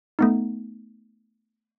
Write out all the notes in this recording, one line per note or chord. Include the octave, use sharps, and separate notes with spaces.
A3 B3 D#4